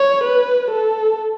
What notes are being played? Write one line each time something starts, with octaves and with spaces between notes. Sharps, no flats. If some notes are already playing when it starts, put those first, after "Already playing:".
Already playing: C#5
B4
A4